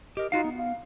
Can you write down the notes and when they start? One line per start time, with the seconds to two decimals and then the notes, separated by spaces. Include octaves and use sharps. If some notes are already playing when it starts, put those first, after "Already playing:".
0.17 G4 A#4 D#5
0.32 D#4 F4 F#4 F5
0.44 B3
0.58 F5